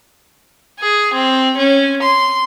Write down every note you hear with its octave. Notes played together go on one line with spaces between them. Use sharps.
G#4
C4
C#4
C6